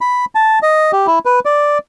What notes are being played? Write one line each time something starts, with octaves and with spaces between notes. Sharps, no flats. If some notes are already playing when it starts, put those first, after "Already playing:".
B5
A5
D#5
G4
E4
B4
D5